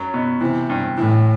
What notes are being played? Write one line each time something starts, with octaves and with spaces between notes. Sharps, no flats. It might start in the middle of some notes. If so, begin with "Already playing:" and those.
Already playing: F#2 F#3
B2
C3 E3
G2
A2 E3